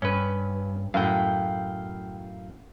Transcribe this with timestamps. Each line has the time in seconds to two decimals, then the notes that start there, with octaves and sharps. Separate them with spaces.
0.02 G2 C#4 B4
0.94 F#2 A2 F5 G5